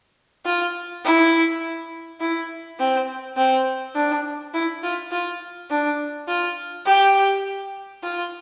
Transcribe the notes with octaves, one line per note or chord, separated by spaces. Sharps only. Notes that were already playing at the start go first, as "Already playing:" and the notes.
F4
E4
E4
C4
C4
D4
E4
F4
F4
D4
F4
G4
F4